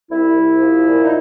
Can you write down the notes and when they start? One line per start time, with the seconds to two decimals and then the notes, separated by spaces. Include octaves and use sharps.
0.10 C2 E4
0.35 C2
0.61 F3
0.86 A#2
1.04 D#4